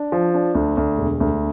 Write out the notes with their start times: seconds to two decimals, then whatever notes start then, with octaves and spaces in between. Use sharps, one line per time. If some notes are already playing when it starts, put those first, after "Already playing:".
Already playing: D4
0.12 F3
0.34 D4
0.55 D2
0.77 D2
0.98 E1
1.20 D2